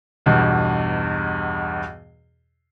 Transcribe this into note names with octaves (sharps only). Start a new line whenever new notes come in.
B1 E2 G2 B2